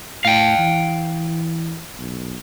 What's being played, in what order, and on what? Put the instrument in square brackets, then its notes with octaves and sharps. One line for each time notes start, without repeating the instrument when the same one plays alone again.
[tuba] A2 [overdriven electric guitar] F5 G5
[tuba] E3
B1